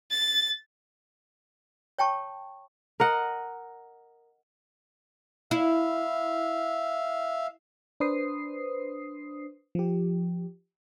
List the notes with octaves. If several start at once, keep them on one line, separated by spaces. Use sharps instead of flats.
A6
C#5 G5 A5 C#6
A#4 D#5 F#5
E4 E5 F5
D4 B4 C5 D#6 C7
F3 G4